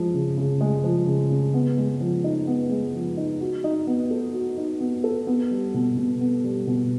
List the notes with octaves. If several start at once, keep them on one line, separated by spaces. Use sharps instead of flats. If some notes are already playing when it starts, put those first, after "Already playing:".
Already playing: F3 G#3
C#3
C#3
G#3
F3
C#3
C#3
B3
G#3
F3
D#4
B3
G#3
F3
D#4
F#4
D#4
B3
A4
F#4
D#4
B3
A4
B3
G3
B2
B2
B3
G3
B2